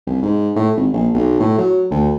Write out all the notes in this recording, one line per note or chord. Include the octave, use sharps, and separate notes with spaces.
C2
G#2
A2
G#1
A#1
B1
A2
F#3
D2